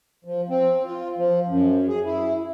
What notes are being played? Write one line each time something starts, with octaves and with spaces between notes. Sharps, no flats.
F3
C4
F4
F3
F#2
G#4
E4